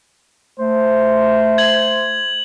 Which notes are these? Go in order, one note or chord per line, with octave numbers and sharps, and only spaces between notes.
A3 C5
G#6 F#7